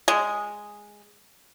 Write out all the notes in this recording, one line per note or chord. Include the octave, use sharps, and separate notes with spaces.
G#3